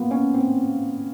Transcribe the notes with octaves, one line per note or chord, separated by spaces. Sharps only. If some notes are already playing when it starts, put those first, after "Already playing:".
Already playing: A#3 B3 F4
C#4
C4